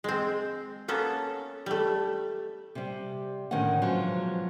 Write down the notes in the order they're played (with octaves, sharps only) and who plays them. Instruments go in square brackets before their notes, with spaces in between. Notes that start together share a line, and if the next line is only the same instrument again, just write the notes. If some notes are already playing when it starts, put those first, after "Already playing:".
[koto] G#3 C4
A#3 B3 C#4 A4
G3 A3
[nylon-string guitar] C3 G3
A2 D3 D#3 C#4 A4 F#5
G#2 B2 F3 F#3